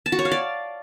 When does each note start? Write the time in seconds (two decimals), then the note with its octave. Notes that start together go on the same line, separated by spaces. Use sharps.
0.06 A5
0.12 F#4
0.19 C#5
0.25 F5
0.32 D5